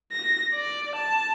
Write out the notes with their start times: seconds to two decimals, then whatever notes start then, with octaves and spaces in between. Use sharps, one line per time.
0.12 A#6
0.54 D5
0.95 A5